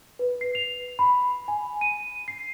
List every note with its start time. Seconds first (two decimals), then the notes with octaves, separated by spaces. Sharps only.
0.19 B4
0.41 C7
0.55 F7
0.99 B5
1.48 G#5
1.81 D#7
2.28 C7